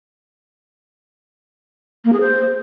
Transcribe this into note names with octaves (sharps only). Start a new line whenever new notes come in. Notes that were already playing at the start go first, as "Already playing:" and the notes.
A#3
G#4
C5